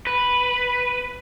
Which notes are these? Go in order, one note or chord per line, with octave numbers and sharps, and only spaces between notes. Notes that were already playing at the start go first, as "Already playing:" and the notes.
B4